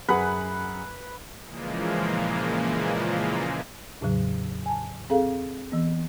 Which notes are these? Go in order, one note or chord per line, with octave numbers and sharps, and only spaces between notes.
F#2 G#4 B4 F#5
A#2 C#3 E3 F3 G#3 A#3
E2 A2 C#3 F#3
G#5 A5
C4 G#4 A4 F5
E3 B3